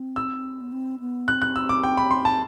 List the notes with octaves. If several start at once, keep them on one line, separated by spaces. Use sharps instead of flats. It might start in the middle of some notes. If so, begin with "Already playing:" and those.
Already playing: C4
E6
B3
C4
B3
C4 F#6
F#6
E6
D6
G5
B5
C6
A5